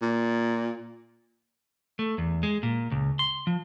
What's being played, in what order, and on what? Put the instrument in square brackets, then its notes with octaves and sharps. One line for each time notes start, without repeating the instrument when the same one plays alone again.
[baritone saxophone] A#2
[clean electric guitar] A3
E2
G#3
A#2
C#2
C6
F3